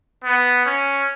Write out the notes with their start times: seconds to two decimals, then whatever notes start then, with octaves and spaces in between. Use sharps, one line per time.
0.24 B3
0.65 C#4